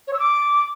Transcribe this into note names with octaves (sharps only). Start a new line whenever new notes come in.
C#5
E6
D6